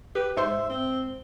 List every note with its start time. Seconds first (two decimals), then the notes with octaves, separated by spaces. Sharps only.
0.15 G4 B4
0.37 G#2 C5 E5 C6
0.70 C4